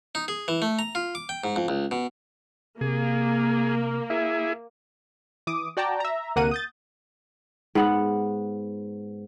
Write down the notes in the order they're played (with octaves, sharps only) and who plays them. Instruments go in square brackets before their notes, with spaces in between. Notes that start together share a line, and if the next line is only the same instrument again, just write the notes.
[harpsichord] D#4
G#4
E3
A3
A#5
F4
D6
G5
G#2
F2
C#2
B2
[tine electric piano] C3 [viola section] A#3 [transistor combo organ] G#4
[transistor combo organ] E4 G#4 [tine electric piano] E5
[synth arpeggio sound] E3 D6 D#6
F#4 D5 G5 A5 A#5
E5 A#5
D2 C3 A#3 A#4 F#5 D#7
D#6 G6 A6
[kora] G#2 B3 F#5